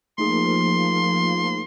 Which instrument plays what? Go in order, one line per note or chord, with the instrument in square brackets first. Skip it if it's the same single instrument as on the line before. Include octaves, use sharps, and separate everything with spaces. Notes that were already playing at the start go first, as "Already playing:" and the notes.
[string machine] F3 A#3 [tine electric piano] A3 D#4 G#4 [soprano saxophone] C6